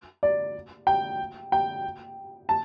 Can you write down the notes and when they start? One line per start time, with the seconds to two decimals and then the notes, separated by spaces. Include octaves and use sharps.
0.23 D5
0.87 G5
1.52 G5
2.49 A5